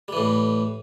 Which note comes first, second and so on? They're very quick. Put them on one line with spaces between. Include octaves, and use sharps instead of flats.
G3 E3 A2